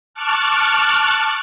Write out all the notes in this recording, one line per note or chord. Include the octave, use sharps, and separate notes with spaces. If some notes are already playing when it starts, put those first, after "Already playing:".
A5 C#6 D6 F6 F#6